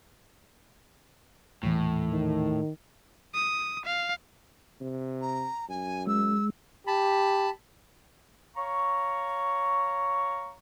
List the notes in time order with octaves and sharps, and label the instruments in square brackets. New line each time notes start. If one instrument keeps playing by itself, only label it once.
[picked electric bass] D#1 E3 [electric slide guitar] A2
[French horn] D#3
[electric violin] D#6
F5
[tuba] C3
[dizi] A#5
[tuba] F#2 [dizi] G#5
[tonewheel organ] G#3 [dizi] E6
[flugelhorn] G4 [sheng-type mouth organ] A5 B5
[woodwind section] C#5 F5 A#5 C#6